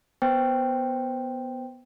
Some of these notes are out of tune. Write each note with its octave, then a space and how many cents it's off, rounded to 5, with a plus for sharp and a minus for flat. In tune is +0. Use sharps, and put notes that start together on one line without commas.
B3 +0 C5 +0 G5 +0